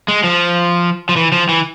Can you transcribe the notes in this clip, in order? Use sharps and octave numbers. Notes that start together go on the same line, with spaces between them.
G#3
F3
F3
E3
F3
E3